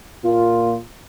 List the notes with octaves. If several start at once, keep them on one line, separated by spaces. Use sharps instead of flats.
A#2 F4